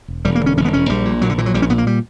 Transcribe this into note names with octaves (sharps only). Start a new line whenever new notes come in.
E1
E1 G3
A#3
D3
C#4
E1 C#4
B3
E1 C#4
A#1 G3
A#2
A#1 F#3
D3
A#2 E3
F#3
A#1 G3
C#4
A#2 B3
A#3
G3